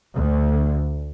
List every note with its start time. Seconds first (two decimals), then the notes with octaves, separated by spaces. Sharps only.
0.13 D2